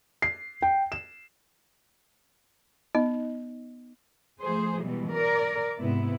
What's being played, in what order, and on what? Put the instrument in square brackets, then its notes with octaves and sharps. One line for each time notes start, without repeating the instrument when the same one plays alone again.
[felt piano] C7
G5
E7
[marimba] B3 [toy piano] D#4 D#5
[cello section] F3 A3 G#4 C5
B2 E3 G3 G#3
A#4 D5
G#2 C3 B3 E4